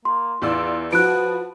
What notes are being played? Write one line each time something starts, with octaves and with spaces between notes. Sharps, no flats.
A#3 C6
E2 F4 D5 E6
F3 F#4 B4 F#6 D7